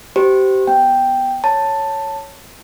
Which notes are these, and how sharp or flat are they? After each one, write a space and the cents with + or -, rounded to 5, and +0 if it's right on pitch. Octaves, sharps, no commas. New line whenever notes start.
G4 -25 C5 -20
B3 +0 G5 +0
C#5 +0 A5 +10